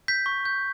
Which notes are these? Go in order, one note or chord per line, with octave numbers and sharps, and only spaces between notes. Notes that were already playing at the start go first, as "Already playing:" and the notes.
G6 B6
C#6
G6